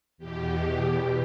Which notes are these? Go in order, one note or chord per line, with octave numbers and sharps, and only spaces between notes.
E2 B2 G4